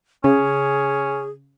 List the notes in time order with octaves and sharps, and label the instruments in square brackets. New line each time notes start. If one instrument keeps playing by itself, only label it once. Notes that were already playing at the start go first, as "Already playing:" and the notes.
[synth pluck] C#3 [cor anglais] C#4 [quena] G#4